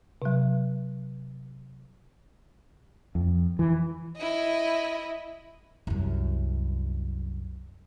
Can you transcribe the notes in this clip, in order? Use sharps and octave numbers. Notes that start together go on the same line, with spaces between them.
C3 F#3
F2
E3
E4 D#5
C2 F#2